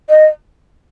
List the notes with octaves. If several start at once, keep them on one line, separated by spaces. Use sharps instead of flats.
D#5